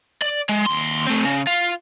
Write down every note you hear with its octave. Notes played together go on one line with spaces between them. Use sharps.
D5
G#3
D#2 C6
A3 C4
C#3
F4